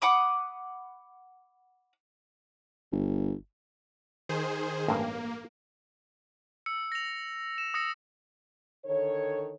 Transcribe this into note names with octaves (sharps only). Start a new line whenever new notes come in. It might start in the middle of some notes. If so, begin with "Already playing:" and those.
F#5 B5 D6 D#6
G1
D#3 G#4 C5
A1 G2 A#3
E6 C#7
A#6 F7
E7
D#6 E6 A#6 C#7
D3 D#3 A4 C#5